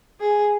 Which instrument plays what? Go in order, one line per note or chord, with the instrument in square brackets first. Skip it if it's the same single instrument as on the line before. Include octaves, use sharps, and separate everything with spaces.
[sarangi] G#4